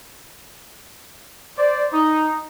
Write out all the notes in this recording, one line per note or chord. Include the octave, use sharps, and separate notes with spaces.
C5 D5
D#4